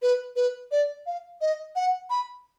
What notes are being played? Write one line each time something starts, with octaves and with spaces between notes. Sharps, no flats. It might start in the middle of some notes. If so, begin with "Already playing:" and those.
B4
B4
D5
F5
D#5
F#5
B5